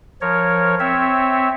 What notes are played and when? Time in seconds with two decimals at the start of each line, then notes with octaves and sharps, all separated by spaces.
0.21 F3 A#4 C#5
0.80 C4 C#5 E5